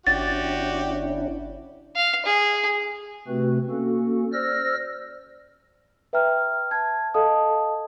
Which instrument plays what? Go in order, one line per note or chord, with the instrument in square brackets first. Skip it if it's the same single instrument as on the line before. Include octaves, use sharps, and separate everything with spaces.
[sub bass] G1 [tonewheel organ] C#4 D4 E4 [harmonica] F#4 G4 [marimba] A6
[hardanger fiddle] F5
G#4
[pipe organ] C3 A3 C4 F#4 B4
A#3 C#4 F#4 A4
C5 D5 E6 F6 A#6
[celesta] B4 E5 G5 A#5 F6
A5 G#6
A4 D#5 F5 A5 D#6